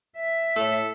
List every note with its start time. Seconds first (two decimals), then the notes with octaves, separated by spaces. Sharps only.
0.17 E5
0.56 A2 A4